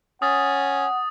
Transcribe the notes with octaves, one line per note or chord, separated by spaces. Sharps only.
C#4 F#5 D#6 A6